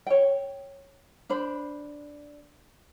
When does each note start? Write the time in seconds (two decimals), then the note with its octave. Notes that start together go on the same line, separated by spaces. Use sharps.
0.07 C#5 G5
1.29 D4 C5 B5